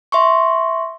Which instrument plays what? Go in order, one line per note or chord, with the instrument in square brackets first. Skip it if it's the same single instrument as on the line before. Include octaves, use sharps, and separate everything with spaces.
[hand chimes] E5 C6 C#6